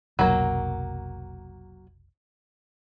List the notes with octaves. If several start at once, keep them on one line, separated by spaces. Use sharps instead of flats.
F1 B1 F#3 A#3